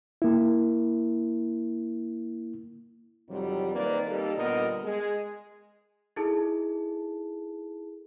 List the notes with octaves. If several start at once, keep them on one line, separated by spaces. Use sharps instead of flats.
A#3 E4
F2 C3 D#3 F#3 G3
D#3 A#3 C4 B4 D5
G3 A#3 D#4 G4 A4
A#2 D3 G3 B3 A#4 D#5
G#3 G#4
D#4 E4 G#4 A4 A5